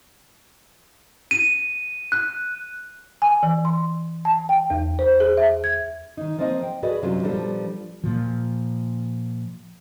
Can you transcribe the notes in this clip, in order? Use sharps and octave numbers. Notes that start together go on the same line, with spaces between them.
D#7
F#6
G#5
E3
C6
A5
G5
E2
C5
G#4
E5
G#6
D#3 D#4
F3 A#3 C4 D#5
G5
F#4 G#4 A4 B4 D5 D#5
F#2 C3 F#3 G3 C#4 F4
A#2 F3 G3 B3 D4 A4
A#2 F3